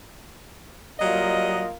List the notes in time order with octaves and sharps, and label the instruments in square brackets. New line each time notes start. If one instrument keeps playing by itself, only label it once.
[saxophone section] F#3 G3 D#5 [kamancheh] A#3 F4